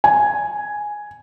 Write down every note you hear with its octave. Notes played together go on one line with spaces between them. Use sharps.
G#5